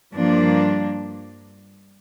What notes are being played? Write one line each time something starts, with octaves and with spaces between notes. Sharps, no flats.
G2 F3 A#3 D4